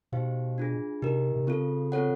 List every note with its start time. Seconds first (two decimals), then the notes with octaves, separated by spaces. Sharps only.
0.12 B2 D#4 G4 C5 F5
0.58 D4 F4 G#4
1.02 C3 D#4 G4 A#4
1.36 C3
1.47 C#3 C4 F4 A4
1.92 C4 F4 A4 C#5 F#5